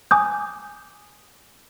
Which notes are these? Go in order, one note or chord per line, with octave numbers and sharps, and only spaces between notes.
G#5 D6 D#6 G6